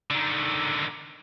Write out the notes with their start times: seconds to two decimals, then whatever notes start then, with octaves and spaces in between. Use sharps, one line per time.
0.10 D3 D#3